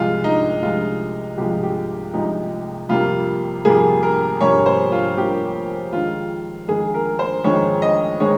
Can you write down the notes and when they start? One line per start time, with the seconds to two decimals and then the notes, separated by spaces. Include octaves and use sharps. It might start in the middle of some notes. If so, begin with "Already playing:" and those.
Already playing: C2 C3 F3 G#3 F4
0.24 D#4
0.62 C2 C3 F3 G#3 F4
1.38 C2 C3 F3 G#3 G4
1.63 G4
2.13 C2 C3 F3 G#3 D#4
2.89 F2 C3 G3 A#3 F4
3.65 F2 C3 G3 A#3 G#4
4.03 A#4
4.41 F2 C3 G3 A#3 C#5
4.66 C5
4.92 F4
5.17 F2 C3 G3 A#3 G4
5.93 F2 D#3 G#3 F4
6.68 F2 D#3 G#3 G#4
6.94 A#4
7.19 C5
7.44 F2 D#3 G#3 C#5
7.82 D#5
8.20 D#3 G#3 C#5